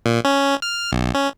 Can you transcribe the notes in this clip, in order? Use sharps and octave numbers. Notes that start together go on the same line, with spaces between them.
A#2
C#4
F6
B1
C#4